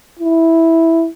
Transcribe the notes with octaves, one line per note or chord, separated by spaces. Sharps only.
E4